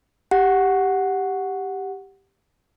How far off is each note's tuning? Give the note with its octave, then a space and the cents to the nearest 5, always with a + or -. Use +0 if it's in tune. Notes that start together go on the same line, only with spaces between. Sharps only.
G4 +0 F#5 +0